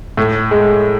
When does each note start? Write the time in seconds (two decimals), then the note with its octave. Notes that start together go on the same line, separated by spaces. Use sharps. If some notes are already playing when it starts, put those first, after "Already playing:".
0.17 A2
0.51 G#3